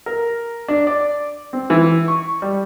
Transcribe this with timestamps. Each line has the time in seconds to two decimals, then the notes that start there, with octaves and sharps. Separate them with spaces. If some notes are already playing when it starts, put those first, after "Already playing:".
0.06 A#4
0.68 D4
0.87 D5
1.53 C4
1.70 E3
2.08 C#6
2.42 G3